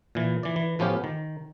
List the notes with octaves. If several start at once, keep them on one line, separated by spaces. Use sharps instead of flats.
A#2 E3
E3 D5
E3
A2 F3 B3 C#4 F4 G4
D#3